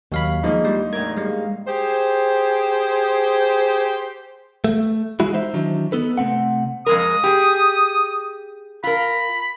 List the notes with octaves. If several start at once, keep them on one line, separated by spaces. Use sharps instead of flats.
D#2 F#3 F5 B5
E3 F3 G#3 A#3 D4 D#4
G3 C5
E2 A2 A#4 G#6
G3 G#3 F5
G4 G#4 C5
A3
E3 G#3 D#4 E4 F#4
D#4 C5 E5
D#3 E3 F#3 D4
B3 D#4 A4 B4
C3 A3 C4 F#5
F2 G#3 A#4 D#6
G4 G#4
F4 A#4 B5